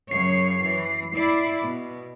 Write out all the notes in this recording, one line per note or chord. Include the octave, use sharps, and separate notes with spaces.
F#2 C#3 C#5 C7
E3
E4 D5
B2